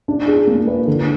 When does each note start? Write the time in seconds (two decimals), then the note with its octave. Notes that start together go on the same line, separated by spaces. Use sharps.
0.08 D4
0.28 G#4
0.47 A#3
0.68 B4
0.88 D3